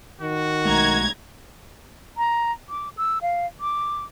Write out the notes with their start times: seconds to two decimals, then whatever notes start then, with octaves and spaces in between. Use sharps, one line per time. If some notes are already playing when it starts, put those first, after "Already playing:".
0.21 D#3 F#4
0.65 B1 G#3 A3 A#5 G#6
2.18 A#5
2.69 D6
2.97 E6
3.22 F5
3.60 D6